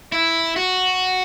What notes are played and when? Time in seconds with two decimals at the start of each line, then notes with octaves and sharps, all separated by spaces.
0.12 E4
0.56 F#4